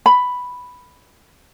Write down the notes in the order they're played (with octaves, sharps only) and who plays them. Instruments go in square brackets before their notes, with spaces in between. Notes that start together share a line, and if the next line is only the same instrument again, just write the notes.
[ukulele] B5